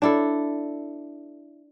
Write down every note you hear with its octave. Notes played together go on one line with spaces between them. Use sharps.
D4 E4 A4